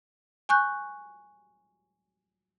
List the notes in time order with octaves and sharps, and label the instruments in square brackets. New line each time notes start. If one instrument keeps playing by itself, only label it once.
[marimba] G#5 C#6 F#6 G6